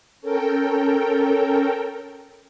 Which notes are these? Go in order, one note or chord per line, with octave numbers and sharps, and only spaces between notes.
C#4 A4 A#4 G5